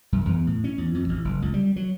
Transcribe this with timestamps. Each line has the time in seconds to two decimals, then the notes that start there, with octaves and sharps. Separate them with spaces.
0.12 F#2
0.25 E2
0.47 A2
0.64 C#4
0.78 E2
0.95 F2
1.09 A1
1.25 F#1
1.42 C#2
1.54 G3
1.76 F#3